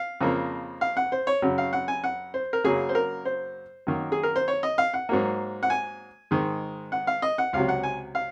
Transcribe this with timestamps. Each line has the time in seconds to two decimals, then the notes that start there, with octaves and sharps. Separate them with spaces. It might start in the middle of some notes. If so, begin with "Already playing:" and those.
Already playing: F5
0.21 F2 C#3 F3 A#3
0.81 F5
0.97 F#5
1.12 C5
1.27 C#5
1.42 F#2 C#3 F#3
1.58 F5
1.73 F#5
1.88 G#5
2.04 F#5
2.34 C5
2.53 A#4
2.64 F#2 C#3 F#3 A#3 G#4
2.89 C5
2.95 A#4
3.25 C5
3.87 F#2 D#3 A#3
4.12 G#4
4.23 A#4
4.36 C5
4.48 C#5
4.63 D#5
4.78 F5
4.94 F#5
5.09 G#2 F#3 A#3
5.63 F#5
5.70 G#5
6.31 G#2 D#3 G#3
6.92 F#5
7.07 F5
7.22 D#5
7.38 F#5
7.53 C#2 C3 F#3 F5
7.69 F#5
7.83 G#5
8.15 F5